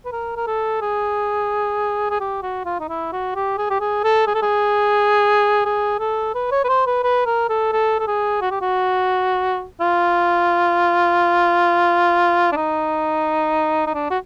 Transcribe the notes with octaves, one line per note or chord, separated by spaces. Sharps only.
B4
A#4
A#4
A4
G#4
G#4
G4
F#4
F4
D#4
E4
F#4
G4
G#4
G4
G#4
A4
G#4
A4
G#4
G#4
A4
B4
C#5
B4
C5
B4
B4
A#4
A4
A4
A4
G#4
F#4
G4
F#4
F4
D4
D#4
D#4
D4
F#4